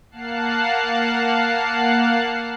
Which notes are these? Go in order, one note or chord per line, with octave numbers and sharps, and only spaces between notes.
A#3 F5 F#5 A5 F#6 C7